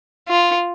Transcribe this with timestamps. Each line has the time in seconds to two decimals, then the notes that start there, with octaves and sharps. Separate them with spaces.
0.28 F4